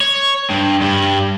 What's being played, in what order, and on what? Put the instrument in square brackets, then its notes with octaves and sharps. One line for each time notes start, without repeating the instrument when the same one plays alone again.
[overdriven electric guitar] C#5
G2
G2